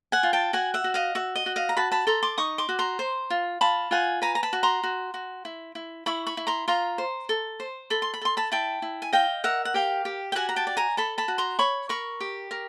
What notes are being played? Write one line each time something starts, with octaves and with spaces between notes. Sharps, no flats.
F#5 G#5
F4
G5 A5
F#4 F#5 G#5
E5 F#5
F#4
D#5 F5
F#4 E5
D#5
F#4
D#5 F5
A#5
F#4 A5 B5
A5 B5
A4 A#5 C6
C6 D6
D#4 C#6 D#6
C6 D6
F#4
A#5 C6
C5
F4
F4 A5 B5
F4 F#5 G#5
B4 G#5 A#5
A#5
A5 B5
F#4
A#5 C6
F#4
F#4
E4
E4
E4 B5 C#6
B5 C#6
E4
A#5 C6
F4 A#5 C6
C5
A4
C5
A4 B5
C6
B5
A4 C6
A5 B5
E4 G5 A5
E4
G#5
D#5 F5 G5
A#4 E5 F#5
F#5
G4 F5 G5
G4
G5
F#4 F#5 G#5
A#5
G5 A5
D5
G#5 A#5
A4 A5 B5
A5 B5
F#4
A#5 C6
C#5 B5 C#6
A#4 B5 C#6
G4
A#4